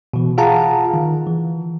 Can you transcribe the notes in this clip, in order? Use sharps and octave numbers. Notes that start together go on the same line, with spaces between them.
B2 E3
F4 G#4 F5 F#5 A5 A#5
D#3
E3